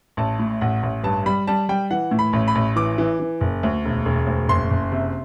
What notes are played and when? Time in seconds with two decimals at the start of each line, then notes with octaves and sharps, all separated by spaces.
0.17 A1 A5
0.39 A2
0.61 A1 F#5
0.83 A1
1.03 G2 A5
1.26 G3 B5
1.47 G3 A5
1.69 G3 G5
1.91 E3 F#5
2.11 A2
2.19 B5
2.33 A1
2.48 B5
2.55 A1
2.76 E3 D6
2.98 E3
3.20 E3
3.41 F#1
3.63 D2
3.85 E1
4.05 E1
4.27 D2
4.49 F#1 C6
4.71 F#1
4.92 C3